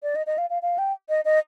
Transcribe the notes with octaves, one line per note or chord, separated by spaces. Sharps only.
D5
D#5
D#5
F5
F5
F5
G5
D#5
D#5